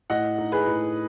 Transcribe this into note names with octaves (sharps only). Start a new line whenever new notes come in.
A2 D#5 F#5
D#4
G#4 B4
A2